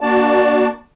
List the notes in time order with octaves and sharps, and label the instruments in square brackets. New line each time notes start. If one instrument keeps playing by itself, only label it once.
[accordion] A#3 D4 F#4 D5 A5